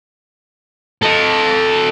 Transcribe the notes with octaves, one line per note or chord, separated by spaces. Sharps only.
A4 D#5